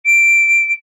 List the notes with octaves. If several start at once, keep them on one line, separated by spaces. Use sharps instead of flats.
D7